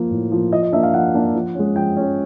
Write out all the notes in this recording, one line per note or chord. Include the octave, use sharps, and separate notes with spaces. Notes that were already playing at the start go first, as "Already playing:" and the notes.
Already playing: F3 A#3
A2
F3 A#3
F3 D#5
D#5
A#3 D4 E5
F5
F3 F#5
A#3 D4
F3
G#3 C#4
F3 G5
G#3 C#4